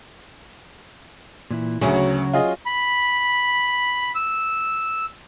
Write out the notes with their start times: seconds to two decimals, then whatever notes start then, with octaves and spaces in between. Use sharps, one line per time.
1.51 A#2 E3 E4
1.81 D2 C#3 F#3 C#4 G#4
2.33 F4 G#4 D#5
2.66 B5
4.15 E6